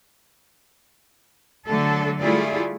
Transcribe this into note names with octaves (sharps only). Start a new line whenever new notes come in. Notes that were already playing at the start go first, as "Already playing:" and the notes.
D3 F#3 A3 A4
G3 A3 E4 F4 G#4 D5